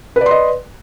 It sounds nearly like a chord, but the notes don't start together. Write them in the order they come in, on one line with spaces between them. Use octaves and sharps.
B4 D5 C6 D#5